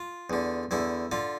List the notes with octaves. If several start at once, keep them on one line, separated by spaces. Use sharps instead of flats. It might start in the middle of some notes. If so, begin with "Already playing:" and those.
Already playing: F4
E2 D3
E2 D3 E4
D3 F4